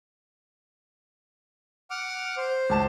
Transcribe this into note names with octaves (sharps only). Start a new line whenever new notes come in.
F#5 D6 F6
C5
C#2 A5 E7